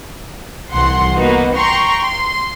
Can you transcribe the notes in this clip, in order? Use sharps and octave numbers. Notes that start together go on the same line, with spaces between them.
C2 E3 F#5 C6
A#3 B3 D#4 F#4
G5 A#5 C6 C#6
C6